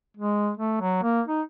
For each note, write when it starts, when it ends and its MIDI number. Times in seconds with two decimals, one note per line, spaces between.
0.17 0.51 56
0.57 0.78 57
0.81 0.98 54
1.03 1.21 58
1.28 1.42 63